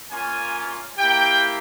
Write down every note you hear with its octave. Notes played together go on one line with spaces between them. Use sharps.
A#3 C#4 F4 G#5
A#3 E4 G4 G5